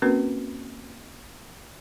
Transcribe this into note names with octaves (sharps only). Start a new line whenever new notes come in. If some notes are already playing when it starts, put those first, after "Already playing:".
A#3 C4 C#4 F#4 A#4 B4